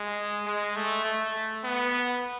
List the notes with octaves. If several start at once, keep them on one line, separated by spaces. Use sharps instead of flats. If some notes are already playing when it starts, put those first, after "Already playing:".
Already playing: G#3
G#3
A3
A3
B3